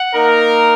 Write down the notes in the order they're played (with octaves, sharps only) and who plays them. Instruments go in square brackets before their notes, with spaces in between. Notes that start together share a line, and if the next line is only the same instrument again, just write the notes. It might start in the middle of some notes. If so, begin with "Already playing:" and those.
Already playing: [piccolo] F#5
[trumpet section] A#3 D#4 A#4